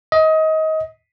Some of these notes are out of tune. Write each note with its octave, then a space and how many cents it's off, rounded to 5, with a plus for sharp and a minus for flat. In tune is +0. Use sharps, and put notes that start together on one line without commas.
D#5 +25